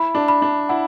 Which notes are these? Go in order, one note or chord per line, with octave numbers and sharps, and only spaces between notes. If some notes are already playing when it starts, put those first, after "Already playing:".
Already playing: E4 B5
D4
B5
D4
E4 F#5